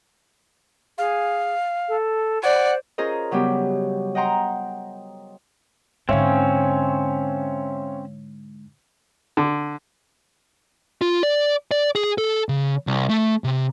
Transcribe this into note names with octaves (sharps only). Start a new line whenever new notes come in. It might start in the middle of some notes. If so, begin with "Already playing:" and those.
G#4 F5
A4
C5 D5 F#5
C#4 F4 G#4 A#4 C5 D#5
C#3 F#3 G3 B3 G4
D#5 F#5 G5 A#5 C6
G#2 D3 C4 C#4 C#5 E5 F5
D3
F4
D5
D5
G#4
A4
C#3
C2
A3
C3